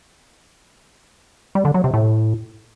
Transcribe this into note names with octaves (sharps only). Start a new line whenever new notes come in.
G3
D3
F#3
C3
A2